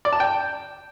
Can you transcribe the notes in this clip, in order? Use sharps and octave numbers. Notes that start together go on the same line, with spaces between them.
D5
A5
G5